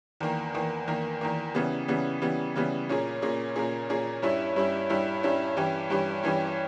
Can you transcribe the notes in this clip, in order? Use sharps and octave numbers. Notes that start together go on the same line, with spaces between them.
E2 D#3 A#3
E2 D#3 A#3
E2 D#3 A#3
E2 D#3 A#3
C#3 E3 G3 B3
C#3 E3 G3 B3
C#3 E3 G3 B3
C#3 E3 G3 B3
A#2 A#3 C#4 G#4
A#2 A#3 C#4 G#4
A#2 A#3 C#4 G#4
A#2 A#3 C#4 G#4
G2 G3 C#4 E4
G2 G3 C#4 E4
G2 G3 C#4 E4
G2 G3 C#4 E4
G2 E3 G3 C#4 G4
G2 E3 G3 C#4 G4
G2 E3 G3 C#4 G4